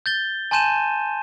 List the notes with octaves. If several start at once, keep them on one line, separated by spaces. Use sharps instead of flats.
G6 A6 G7
G#5 A5 C6 G6 D#7 E7